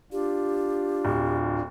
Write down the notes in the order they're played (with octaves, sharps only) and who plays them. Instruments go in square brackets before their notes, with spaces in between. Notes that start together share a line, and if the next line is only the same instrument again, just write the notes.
[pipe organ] D4 F4 [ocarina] G4
[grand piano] D1